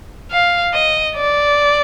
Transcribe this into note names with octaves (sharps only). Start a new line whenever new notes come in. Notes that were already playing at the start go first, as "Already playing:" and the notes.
F5
D#5
D5